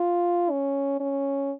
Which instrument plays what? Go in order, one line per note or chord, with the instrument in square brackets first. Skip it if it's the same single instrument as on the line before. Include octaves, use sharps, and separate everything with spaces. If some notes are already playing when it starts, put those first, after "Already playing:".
Already playing: [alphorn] F4
C#4
C#4